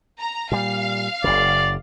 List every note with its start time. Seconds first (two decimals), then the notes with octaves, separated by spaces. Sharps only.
0.19 A#5
0.52 A#2 G3 F5
1.24 F#1 C#3 D5